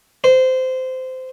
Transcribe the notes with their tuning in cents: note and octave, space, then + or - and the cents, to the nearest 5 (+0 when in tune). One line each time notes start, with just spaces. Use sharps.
C5 -20